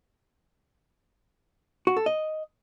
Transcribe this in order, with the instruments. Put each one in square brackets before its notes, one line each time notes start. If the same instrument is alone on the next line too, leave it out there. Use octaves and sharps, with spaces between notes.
[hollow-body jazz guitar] F#4
A4
D#5